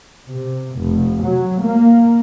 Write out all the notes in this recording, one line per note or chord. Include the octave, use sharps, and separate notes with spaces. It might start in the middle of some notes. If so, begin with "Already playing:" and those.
C3
F1
F#3
A#3